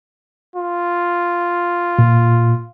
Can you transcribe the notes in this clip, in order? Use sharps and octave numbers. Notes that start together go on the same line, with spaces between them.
F4
A#2